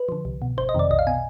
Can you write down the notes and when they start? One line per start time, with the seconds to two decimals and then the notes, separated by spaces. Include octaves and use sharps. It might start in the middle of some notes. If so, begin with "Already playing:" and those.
Already playing: B4
0.09 D3 F3
0.25 C2
0.42 B2
0.57 G1 C5
0.69 D#5
0.74 F2 C3 D#3 D5
0.90 B1 D#5
0.99 F5
1.07 B2 G#5